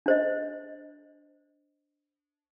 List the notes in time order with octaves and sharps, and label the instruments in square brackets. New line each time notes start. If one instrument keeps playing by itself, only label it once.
[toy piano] D4 C5 D#5